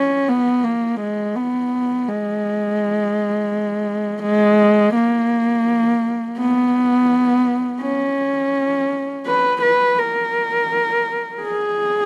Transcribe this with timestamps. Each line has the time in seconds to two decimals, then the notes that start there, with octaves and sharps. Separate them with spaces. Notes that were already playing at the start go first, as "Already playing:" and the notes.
Already playing: C#4
0.28 B3
0.64 A#3
1.00 G#3
1.36 B3
2.08 G#3
4.23 G#3
4.94 A#3
6.39 B3
7.82 C#4
9.26 B4
9.62 B4
9.99 A#4
11.42 G#4